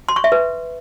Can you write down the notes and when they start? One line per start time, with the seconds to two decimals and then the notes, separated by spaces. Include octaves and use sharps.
0.09 C6
0.16 C#6
0.24 E5
0.32 B4